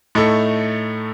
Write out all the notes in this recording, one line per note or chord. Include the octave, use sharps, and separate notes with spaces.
A2 A3 D#4 A4